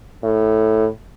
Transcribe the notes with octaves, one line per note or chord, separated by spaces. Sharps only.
A2